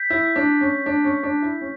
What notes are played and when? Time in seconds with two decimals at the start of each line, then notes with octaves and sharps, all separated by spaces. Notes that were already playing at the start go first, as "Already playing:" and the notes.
Already playing: G6 B6
0.10 E4
0.36 D4
0.61 C#4
0.86 D4
1.04 C#4
1.23 D4
1.42 E4
1.61 C#4